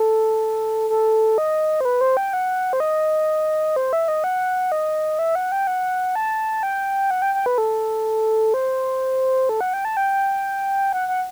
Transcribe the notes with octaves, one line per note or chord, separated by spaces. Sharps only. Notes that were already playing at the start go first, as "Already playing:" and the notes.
Already playing: A4
A4
D#5
C5
B4
C5
G5
F#5
C5
D#5
C5
E5
D#5
F#5
D#5
E5
F#5
G5
F#5
A5
G5
F#5
G5
G5
B4
A4
C5
A4
F#5
G5
A5
G5
F#5
F#5